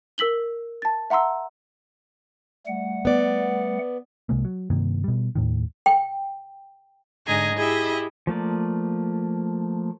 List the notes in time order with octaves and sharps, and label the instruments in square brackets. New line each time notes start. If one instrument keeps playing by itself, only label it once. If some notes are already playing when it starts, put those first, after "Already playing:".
[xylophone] A#4 E6 B6 F#7 G7
A5 A6
E5 F#5 A#5 C6 E6
[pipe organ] G3 A3 F#5
[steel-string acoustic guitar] B3 D5
[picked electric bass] C2 C3 G#3 A#3
F#3
G2 C3 D#3 A#3
B2 G3
D#2 A2 D#3
[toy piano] G5
[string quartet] G#2 D3 G#4 D#5 G#5 A#5
E4 G4 G#4 D#5 E5
[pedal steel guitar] F3 A3 A#3 D5